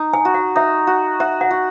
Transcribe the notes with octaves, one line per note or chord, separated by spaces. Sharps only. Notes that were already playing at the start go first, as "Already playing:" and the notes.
Already playing: D#4
G#5
F#4
F#5
D#4 E5
F#4
F#4 E5
F#5
F#4